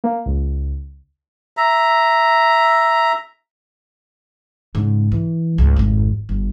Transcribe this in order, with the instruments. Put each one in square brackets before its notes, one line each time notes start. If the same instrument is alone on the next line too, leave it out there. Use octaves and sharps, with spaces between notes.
[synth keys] A#3
C#2
[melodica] E5 A#5
[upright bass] G#2 C#3
E3
C#2 G#2
G#1 F2
G1